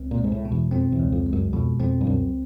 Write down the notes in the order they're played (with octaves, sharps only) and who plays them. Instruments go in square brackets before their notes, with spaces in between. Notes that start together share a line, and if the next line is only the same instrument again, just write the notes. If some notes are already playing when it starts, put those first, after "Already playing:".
Already playing: [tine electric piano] C#2 C4
[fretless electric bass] A#2
[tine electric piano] G#3
[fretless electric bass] G#2
A2
[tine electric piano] B2
[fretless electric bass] E2
[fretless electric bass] F2 [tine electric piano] C4
[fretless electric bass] E2
[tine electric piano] C#2
[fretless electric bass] F2
[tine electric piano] G#3
[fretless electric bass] F#2
[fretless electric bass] F2 [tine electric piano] B2
[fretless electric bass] F2 [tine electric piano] C4
[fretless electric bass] G2
[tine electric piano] C#2 [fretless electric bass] F#2